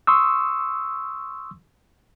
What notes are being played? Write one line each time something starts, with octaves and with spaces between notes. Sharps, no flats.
C6 C#6 D#6 E6